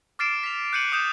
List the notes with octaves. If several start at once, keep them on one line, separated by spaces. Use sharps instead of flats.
D6 F6 A6 C7 D7 E7
B6 F7
F#6 G6 C#7 D#7 F#7
D6 D#6 F#6 G6 E7